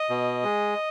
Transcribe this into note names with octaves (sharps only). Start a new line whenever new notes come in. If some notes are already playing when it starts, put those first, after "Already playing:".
Already playing: D#5
B2
G#3